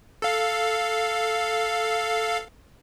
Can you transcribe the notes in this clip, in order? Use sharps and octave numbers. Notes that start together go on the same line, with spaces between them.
A4 F5